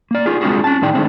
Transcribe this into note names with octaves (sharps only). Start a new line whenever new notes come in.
A#3 D5
D#4 F4 G#4
G#3 C4 D4 F4 F#4 G#4
C#4 A5
A2 D#3 D#4 G#4 D5 G5
D#3 E3 G#3 A3 C4 D4